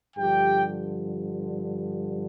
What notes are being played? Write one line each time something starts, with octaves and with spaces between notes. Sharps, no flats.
G2 D3 F3 G4 G5